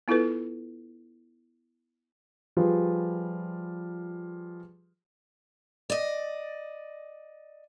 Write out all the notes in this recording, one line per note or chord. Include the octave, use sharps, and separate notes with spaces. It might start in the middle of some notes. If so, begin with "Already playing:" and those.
B3 E4 F4 A4 B4
F3 G3 F4 G4 G#4 B4
D5 D#5